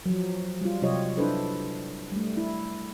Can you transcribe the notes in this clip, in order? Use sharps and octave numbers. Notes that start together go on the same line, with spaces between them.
F3 F#3
G3 F4
C3 F#3 F4 G4 C#5 D#5
D4 E4 A4 B4 C5
G3 A3
E4